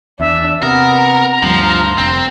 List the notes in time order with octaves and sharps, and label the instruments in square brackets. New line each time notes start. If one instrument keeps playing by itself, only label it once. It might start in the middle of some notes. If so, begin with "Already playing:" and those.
[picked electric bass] E2 [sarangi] D4 [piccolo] E5
[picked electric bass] C3 [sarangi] B3 [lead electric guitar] A#4 [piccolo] D#6
[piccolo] A#5
[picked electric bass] D2 G2 [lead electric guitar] F3 [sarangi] C6
[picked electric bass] F1 [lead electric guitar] C4